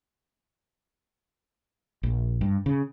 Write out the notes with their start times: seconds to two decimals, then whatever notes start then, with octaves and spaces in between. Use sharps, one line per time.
2.03 A#1
2.41 G2
2.66 C#3